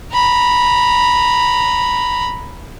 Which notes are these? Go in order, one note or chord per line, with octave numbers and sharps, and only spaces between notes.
A#5 B5